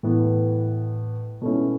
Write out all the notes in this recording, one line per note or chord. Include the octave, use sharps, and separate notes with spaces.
A2 E3 B3
B2 A3 C#4 E4